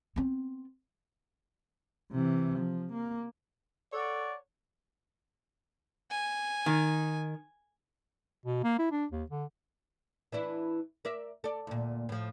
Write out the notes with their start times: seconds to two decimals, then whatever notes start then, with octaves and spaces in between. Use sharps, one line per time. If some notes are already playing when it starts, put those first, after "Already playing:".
0.16 B3 C4
2.12 C3 E3
2.57 F3
2.92 A#3
3.92 A4 C#5 D5 F#5
6.11 G#5
6.66 D#3
8.45 B2
8.64 A#3
8.79 E4
8.91 D4
9.12 D#2
9.30 D3
10.32 E3 D4 E4
11.05 A#4 D5 E5
11.44 A4 D5
11.67 D2 A#2
12.09 A2 F3